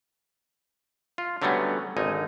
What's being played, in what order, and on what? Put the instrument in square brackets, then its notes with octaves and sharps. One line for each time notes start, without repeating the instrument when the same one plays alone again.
[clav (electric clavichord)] F4
D3 F#3 G3 A3 B3 C#4
G#1 D3 D#4 G#5